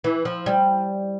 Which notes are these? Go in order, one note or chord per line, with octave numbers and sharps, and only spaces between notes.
E3
F3
G3